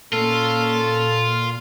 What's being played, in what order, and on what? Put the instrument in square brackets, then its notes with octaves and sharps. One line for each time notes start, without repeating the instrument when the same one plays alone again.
[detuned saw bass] A#2 [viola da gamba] A#3 C#4 [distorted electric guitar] F4 [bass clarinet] A4